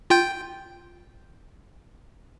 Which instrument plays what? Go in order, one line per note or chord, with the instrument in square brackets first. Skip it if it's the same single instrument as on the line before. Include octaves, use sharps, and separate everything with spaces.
[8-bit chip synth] F4 G5 G6